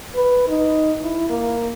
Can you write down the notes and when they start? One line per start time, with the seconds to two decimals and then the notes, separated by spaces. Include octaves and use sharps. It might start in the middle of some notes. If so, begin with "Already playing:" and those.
0.15 B4
0.48 D#4
1.01 E4
1.29 A#3